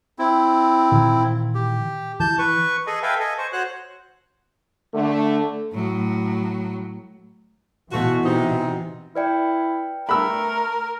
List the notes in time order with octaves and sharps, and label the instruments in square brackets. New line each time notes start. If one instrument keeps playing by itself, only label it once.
[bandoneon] C4 E4
[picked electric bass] A#2 D#3 E3
[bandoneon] G4
[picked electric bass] E3 [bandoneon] A5 G6
[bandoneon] B4 C#6
[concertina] G#4 A4 D#5 G#5
A4 B4 E5 F5 G5 G#5
A4 D#5 G#5
C5 C#6
F#4 C5 C#5 F#6
[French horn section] D3 A3
[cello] A2 F#3
[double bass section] B2 E3 [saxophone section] A3 F4 F#4
[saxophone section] C3 D#4
[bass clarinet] E4 [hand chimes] B4 D5 G5
[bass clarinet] A3 [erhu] A#4 [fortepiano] B5 E6